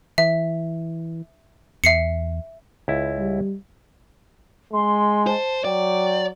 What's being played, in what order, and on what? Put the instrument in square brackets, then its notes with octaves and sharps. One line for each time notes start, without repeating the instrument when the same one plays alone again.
[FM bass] E3 [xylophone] E5
[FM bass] E2 [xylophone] E5 C7 C#7
[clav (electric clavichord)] C#2 E4
[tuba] G3
[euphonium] G#3 [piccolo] C6
[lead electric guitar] C5 [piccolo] A5
[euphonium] F#3 [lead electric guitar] D5 [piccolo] G5